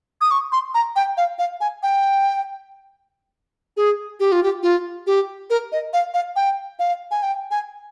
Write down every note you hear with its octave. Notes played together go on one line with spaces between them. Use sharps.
D#6
C#6
C6
A#5
G5
F5
F5
G#5
G5
G#4
G4
F4
G4
F4
G4
A#4
D#5
F5
F5
G5
F5
G#5
G5
G#5